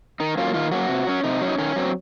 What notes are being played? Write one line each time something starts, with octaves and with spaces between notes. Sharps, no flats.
D#3 D#4
F#3 A#3 C#4 F4
D#3 F4
F#3 A#3 C#4 F#4
C3
F#3 C#4
C3 D#4
F#3 C#4
D#4
D#3 C#4
F#3 C4